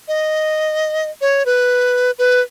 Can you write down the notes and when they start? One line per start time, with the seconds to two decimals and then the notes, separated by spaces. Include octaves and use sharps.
0.08 D#5
1.21 C#5
1.46 B4
2.19 B4